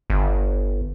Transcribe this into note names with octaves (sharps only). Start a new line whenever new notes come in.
G1